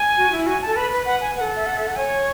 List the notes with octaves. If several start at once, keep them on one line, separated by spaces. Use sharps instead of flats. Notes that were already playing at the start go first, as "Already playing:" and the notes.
Already playing: G#5
F#4
E4
F#4 G#5
A4 A5
B4 B5
B4
B4 F#5
G#5
B4 F#5
A4
E5
F#5
E5
F#5
C#5 G#5